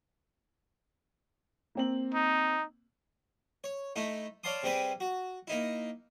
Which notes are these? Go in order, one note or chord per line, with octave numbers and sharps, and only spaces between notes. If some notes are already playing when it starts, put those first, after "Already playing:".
A#3 C4 F#7
D#4
C#5
A3 D#4 E4
C#5 D5 F5 A5 C6 D#6
C3 G3 C4 G#4 B4 G#5
F#4
A#3 D#4 E4